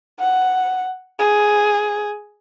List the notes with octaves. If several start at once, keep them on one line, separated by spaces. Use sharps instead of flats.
F#5
G#4